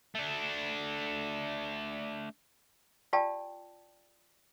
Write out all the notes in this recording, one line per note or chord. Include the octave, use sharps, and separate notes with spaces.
A3 D4
F4 G4 D5 G5 A5